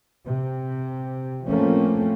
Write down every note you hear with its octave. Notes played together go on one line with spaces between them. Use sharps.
C3
F3 A3 A#3 C4 C#4